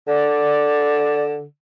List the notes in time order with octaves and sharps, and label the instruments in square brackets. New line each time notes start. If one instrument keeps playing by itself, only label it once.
[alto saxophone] D3 [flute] D5